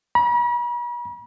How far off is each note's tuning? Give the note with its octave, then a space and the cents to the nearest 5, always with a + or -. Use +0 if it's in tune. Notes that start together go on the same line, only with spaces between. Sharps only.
B5 -45